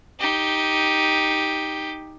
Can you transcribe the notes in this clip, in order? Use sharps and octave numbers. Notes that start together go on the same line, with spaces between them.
D#4 G4